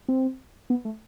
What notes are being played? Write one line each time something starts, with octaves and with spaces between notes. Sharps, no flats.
C4
B3
A3